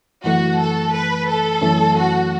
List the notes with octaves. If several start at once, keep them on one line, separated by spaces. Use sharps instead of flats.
F#2 E3 A3 F#4
A4
B4
A4
F#2 E3 A3 C#4
F#4